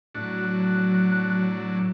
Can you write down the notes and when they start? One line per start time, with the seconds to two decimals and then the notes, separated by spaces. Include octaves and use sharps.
0.15 A2 F#3 D4 F#4 F#6